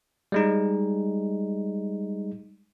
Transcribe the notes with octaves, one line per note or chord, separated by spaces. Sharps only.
G3 G#3 D#4